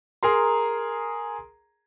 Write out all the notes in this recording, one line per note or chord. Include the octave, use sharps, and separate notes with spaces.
G#4 A#4 A#5 C6